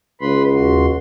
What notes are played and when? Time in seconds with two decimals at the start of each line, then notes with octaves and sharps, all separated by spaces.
0.21 C#2 B4 B5 C6
0.53 D#2 F#4 C6